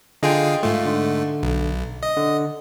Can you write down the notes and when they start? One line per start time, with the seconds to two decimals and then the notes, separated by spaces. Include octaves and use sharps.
0.23 D3 F4 G#4 D#5 G5
0.63 G#2 A3 F4
0.85 D3
1.43 B1
2.03 D#5
2.17 D3